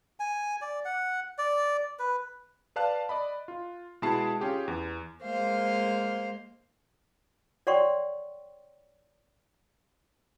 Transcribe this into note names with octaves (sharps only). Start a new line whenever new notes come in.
G#5
D5
F#5
D5
B4
B4 D5 F5 A5 F#6
D5 D#5 B5
F4
B2 G#3 E4 G#4 A5 C7
C#4 F4 G4 G#4
E2
G#3 A#3 C5 F5
C#5 D5 F#5 G5 C6 C#6